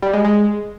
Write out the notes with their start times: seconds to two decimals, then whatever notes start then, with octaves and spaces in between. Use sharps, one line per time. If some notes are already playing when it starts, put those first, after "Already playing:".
0.02 G3
0.13 G#3
0.24 G#3